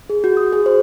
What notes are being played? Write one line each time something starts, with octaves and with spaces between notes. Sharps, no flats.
G#4
F#4
D#6
G#4
C5